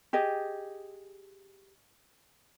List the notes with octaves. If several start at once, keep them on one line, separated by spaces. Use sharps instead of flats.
G4 G#4 D#5